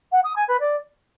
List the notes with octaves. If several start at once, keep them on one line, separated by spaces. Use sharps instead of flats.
F#5
D#6
G#5
B4
D5